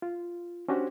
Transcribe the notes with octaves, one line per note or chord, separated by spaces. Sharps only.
F4
C#4 D4 F#4 G4 C5